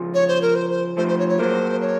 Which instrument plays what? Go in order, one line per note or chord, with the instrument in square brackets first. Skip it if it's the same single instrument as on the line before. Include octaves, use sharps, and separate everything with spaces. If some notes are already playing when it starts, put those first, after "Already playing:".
Already playing: [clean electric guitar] C#3 F3
[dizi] C#5
C5
A#4
C5
C5
[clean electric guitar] F3 A3 [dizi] C5
[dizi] C5
C#5
C#5
[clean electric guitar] F#3 A#3 [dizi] C5
[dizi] C#5